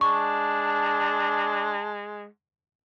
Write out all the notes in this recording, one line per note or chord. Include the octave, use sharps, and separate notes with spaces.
G#3 D4 A5 C#6